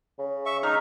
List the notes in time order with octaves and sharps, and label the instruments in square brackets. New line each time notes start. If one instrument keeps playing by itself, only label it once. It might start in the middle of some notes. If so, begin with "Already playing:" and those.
[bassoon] C#3
[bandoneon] E5 C#6
[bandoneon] D#4 [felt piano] F6